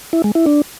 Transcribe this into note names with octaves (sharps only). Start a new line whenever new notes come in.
E4
G#3
E4
D4